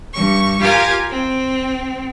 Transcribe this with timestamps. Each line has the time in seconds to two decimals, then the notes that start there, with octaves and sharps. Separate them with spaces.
0.12 G2 C#6
0.61 F4 G4 A#4 F5 G#5
1.09 C4